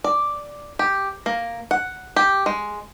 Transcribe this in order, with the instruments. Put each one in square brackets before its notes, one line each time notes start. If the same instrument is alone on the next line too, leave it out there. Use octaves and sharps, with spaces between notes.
[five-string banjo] D5
G4
A#3
F#5
G4
G#3